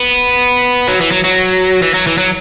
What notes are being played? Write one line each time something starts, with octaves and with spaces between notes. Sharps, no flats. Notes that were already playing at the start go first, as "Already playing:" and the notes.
Already playing: B3
F#3
E3
F#3
F#3
E3
F#3
E3
F#3